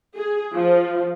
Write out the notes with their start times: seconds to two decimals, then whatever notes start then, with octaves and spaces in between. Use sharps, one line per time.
0.14 G#4
0.54 F3